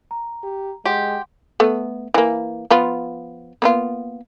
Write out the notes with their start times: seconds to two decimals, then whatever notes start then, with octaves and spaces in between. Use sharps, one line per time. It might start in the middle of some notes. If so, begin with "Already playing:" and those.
0.11 A#5
0.43 G4
0.85 G#3 G4 F#5 C6
1.60 A3 B3
2.14 E3 A#3
2.70 F3 B3 F4
3.62 A#3 B3 F4